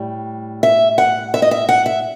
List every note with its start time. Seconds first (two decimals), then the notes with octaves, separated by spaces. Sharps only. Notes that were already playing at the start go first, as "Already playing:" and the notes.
Already playing: A2 G3
0.63 E5
0.98 F#5
1.34 E5
1.42 D#5
1.51 E5
1.69 F#5
1.86 E5